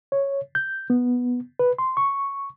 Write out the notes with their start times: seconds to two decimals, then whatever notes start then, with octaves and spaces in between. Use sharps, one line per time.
0.12 C#5
0.55 G6
0.90 B3
1.59 B4
1.79 C6
1.97 C#6